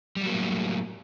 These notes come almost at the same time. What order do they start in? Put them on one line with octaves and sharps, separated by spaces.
G3 F#3 A#3 A2